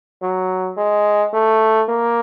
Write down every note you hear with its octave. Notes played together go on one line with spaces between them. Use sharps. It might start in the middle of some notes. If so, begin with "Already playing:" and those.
F#3
G#3
A3
A#3